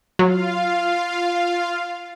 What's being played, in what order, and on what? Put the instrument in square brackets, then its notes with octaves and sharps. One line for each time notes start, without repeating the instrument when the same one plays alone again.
[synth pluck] F#3 [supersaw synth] F4 F5